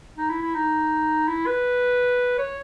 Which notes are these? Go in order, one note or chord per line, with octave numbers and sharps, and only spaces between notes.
D#4
E4
E4
D#4
E4
B4
C#5